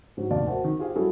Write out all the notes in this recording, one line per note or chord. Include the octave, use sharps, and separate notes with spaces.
G#2 D3 F#3
F1 D#2 D#3 D5 F5 A5
F#4 A#4 C5 E5 F#5 A5
D#3
F4 G4 G#4 C5 F5
F#3 G3 E4 F#4 G#4 A4